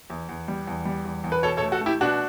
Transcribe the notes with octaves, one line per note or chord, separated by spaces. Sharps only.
E2
E2
G3
E2
G3
E2
E2
B4
B2 A4 C#5
A4 C#5
A3
F#4 A4
A3 E4 G4
B2 D4 F#4